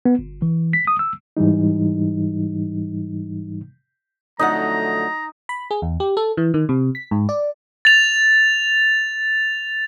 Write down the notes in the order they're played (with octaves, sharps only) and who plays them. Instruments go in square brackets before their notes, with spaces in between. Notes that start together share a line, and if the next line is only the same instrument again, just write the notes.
[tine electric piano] B3
G1
E3
B6
D#6
E6
[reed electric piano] G#2 E3 G3 D#4
[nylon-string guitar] F2 D3 F#5 [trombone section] F#3 A3 [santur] D#4 [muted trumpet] A#5
[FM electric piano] B5
G#4
E2
G4
A4
E3
D#3
C3
B6
G#2
D5
[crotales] A6 F7